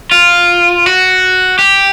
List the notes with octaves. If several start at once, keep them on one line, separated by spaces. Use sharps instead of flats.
F4
F#4
G4